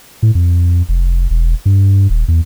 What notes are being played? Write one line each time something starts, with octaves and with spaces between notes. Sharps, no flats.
A2
F2
F1
E1
G2
D#1
E2